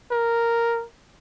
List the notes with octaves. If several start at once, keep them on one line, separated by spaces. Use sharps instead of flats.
A#4